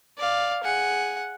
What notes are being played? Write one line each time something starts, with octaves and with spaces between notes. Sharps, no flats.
D5 F5
G#4 F#5